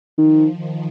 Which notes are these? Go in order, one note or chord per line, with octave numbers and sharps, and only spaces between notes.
D#3 F3
D#3